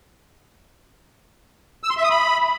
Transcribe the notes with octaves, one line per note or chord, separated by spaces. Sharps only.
E6
C6
E5
D#6
B5